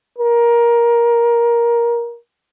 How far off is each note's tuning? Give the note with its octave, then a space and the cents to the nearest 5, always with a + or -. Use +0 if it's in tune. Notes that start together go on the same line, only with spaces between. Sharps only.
A#4 +15